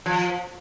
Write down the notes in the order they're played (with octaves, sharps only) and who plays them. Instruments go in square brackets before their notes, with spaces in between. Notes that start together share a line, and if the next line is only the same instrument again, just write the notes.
[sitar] F3